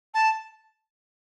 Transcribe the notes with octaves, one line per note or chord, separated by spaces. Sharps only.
A5